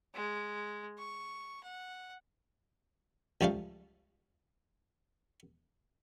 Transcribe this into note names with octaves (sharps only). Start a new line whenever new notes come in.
G#3
C#6
F#5
C#2 F3 G3 A3 F5